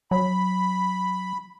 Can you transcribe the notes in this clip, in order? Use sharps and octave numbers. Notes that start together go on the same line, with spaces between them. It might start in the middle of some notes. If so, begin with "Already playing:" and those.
F#3 B5